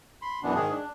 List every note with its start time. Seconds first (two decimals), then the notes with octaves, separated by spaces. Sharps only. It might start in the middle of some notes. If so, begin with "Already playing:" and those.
0.22 B5 C6
0.43 F#2 B2 E3 B3 D4
0.55 G#2 D#3 G#4
0.71 D4